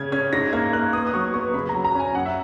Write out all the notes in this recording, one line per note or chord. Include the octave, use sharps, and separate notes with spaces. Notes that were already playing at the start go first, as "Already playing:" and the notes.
Already playing: C#3 C#4 G#6
C#4 G#6
G#2 A#6
A#3 G#6
A#3 F#6
B3 D#6
D#6
F#3 C#6
B3 C#6
C#3 B5
A#5
F#3
A#5
C#4 G#5
F#2 F#5
E5